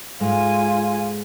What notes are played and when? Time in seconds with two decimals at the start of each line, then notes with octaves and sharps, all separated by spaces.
0.20 G#2 G#3 A3 F4 G#5